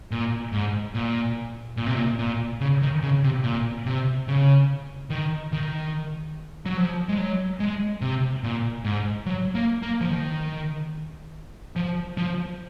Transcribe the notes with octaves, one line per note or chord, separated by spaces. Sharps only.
A#2
G#2
A#2
A#2
C3
A#2
A#2
C#3
D#3
C#3
C3
A#2
C3
C#3
D#3
D#3
F#3
F3
G#3
F#3
G#3
C3
A#2
G#2
F#3
A#3
A#3
F3
D#3
F3
F3